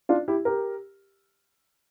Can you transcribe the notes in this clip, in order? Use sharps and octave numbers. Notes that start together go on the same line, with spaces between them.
D4 F4
E4 G4
G4 A#4